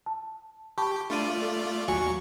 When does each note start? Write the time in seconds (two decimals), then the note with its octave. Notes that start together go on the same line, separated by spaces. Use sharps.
0.06 A5
0.78 G4 A5 B5 C#6
1.10 A3 D4 F4 D5 D#7
1.42 A4
1.88 D#2 F#3 F#4 G#5 C#6